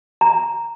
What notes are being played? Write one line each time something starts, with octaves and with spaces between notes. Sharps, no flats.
A#5